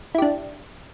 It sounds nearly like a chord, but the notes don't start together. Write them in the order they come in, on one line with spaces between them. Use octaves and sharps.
E4 G4 D4